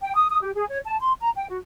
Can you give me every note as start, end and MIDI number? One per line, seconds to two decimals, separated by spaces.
0.01 0.13 79
0.15 0.28 87
0.30 0.38 87
0.42 0.51 67
0.55 0.67 68
0.68 0.78 73
0.85 0.98 81
1.00 1.13 84
1.21 1.30 82
1.35 1.46 79
1.49 1.58 66